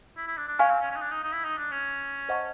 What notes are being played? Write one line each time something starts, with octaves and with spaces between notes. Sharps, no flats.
E4
E4
D4
D4
C#4 F5 G#5 C#6 F6
C4
C#4
C#4
D#4
D4
D#4
D#4
E4
D#4
D4
C#4
C5 D#5 F#5 A5 C#6